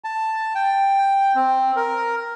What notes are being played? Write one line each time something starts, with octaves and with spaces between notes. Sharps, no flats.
A5
G5
C4
A#4